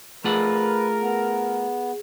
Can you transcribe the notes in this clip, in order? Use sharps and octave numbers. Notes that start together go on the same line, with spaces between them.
A3 F4 G#4 A#4 B4 F#5
B3